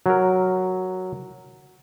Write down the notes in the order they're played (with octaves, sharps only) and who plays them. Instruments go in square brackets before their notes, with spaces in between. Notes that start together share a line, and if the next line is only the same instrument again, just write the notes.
[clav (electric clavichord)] F#3 A#4